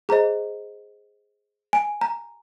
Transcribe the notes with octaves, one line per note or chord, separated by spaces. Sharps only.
G#4 C5 D#5 A#5
G#5
A#5